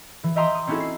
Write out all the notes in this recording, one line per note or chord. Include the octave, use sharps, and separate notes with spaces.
E3
D#5 E5 G5 A#5 C6 D#6
D#6
C4 C#4 D#4 E4 F#4 A4
C7